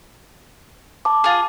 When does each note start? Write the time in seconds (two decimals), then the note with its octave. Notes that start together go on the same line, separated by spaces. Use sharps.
1.05 A5 D6
1.24 F4 G#4